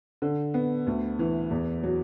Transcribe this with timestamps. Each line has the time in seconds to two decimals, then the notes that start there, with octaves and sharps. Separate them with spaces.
0.22 D3
0.54 B3
0.87 D2
1.19 E3
1.51 E2
1.83 F#3